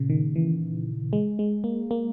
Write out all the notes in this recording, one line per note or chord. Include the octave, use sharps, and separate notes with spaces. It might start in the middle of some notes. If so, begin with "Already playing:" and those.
Already playing: A#2 C#3
D#3
E3
G#3
G#3
A#3
A#3